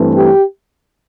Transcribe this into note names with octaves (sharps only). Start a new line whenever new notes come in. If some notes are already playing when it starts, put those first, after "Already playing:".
Already playing: G2 E3 A3 C4
G4